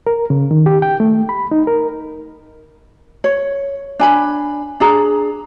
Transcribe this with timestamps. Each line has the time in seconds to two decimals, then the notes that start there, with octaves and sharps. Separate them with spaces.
0.07 A#4
0.30 C#3
0.51 D#3
0.66 G4
0.82 G5
1.00 A3
1.29 B5
1.51 D#4
1.67 A#4
3.24 C#5
3.99 D4 G#5 B5
4.80 D4 G#4 A#5